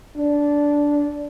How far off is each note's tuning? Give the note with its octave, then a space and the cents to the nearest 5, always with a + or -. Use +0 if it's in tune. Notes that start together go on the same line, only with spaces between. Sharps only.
D4 -10